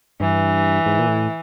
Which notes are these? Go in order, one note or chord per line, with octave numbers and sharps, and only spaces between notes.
G2 E3
G#2
A#2
A2